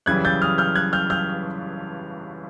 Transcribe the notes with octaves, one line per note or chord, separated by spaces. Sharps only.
F#2 C#3 E3 G3 F#6 G#6
G6 A6
D#6 F6
F6 G6
F#6 G#6
F6 G6
F6 G6